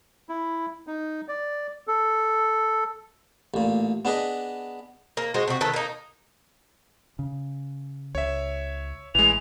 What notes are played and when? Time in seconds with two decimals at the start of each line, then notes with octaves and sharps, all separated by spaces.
0.29 E4
0.87 D#4
1.28 D5
1.87 A4
3.54 A1 A#2
4.05 B3 D4 G#4 B4 D#5
5.17 A#3
5.34 G#3 F#4 C5
5.48 C3 F#4
5.61 D#3 B3 A4
5.73 A#3 D#4
7.19 C#3
8.15 C#2 C#5 E5
9.15 A1 E3 G#3 F7